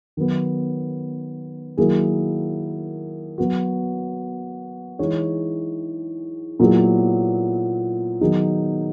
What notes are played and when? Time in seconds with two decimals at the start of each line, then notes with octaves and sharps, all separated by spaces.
0.17 D#3 F#3 B3
1.77 D#3 F#3 A#3 E4 G#4
3.38 F#3 B3 F#4
4.99 E3 G#3 D#4 G#4 C#5
6.60 A#2 F#3 B3 E4 G#4
8.21 D#3 F#3 B3 D#4 G#4